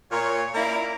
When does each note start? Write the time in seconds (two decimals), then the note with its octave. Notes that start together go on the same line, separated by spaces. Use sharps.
0.11 A#2 C#5
0.55 A#3 C#4 E4 D5 F5 A#5